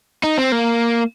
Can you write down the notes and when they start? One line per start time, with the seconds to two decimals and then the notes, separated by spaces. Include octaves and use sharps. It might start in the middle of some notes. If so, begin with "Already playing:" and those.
0.23 D#4
0.38 C4
0.52 A#3